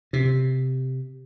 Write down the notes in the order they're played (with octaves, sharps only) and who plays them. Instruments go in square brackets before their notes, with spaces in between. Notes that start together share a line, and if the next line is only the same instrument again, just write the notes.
[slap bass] C3